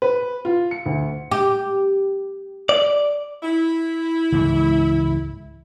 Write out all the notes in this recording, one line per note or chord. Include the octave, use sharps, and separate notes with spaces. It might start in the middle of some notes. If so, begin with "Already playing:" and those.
B4
F4
C#7
D2
G4
D5
E4
C#2 G#2 E3